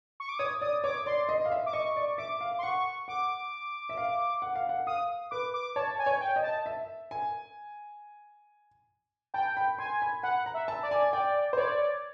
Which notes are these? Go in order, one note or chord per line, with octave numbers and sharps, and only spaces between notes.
C#6
D6
C#5 D#6
D5 D#6
C#5 D6
D5 C6
D#5
F5
E5
D6
D#5 C#6
D5
E5 D6
F5
C6
F#5 C#6
F#5 D6
E5
F5
F#5
F5
F#5
F5 D#6
B4 D6
D6
C#5 A5
G#5
C#5
G5
D#5
A5
E5
G#5
G5 A5
B5
G#5 C6
B5
F#5 B5
A#5
E5
A5
D5
G#5
D5 G5
C5
C#5 D5